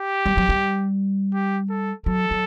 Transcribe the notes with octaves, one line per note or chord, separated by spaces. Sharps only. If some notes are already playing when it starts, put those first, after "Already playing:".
Already playing: G4
G3
F#3
G3
G4
A4
F#3 A4
F#3